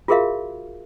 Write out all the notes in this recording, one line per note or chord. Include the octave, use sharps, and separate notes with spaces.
F4 F#4 G#4 A#4 E5 F5